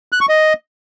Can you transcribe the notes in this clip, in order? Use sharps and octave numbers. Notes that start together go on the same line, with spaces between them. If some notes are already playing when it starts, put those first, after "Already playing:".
F#6
C#6
D#5